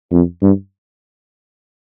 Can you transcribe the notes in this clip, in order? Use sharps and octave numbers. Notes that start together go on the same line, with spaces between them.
F2
G2